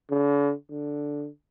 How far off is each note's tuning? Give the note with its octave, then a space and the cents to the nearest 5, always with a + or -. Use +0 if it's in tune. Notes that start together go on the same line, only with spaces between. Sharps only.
D3 -45
D3 -5